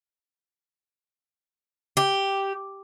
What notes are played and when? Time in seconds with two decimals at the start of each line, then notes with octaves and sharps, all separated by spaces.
1.97 G4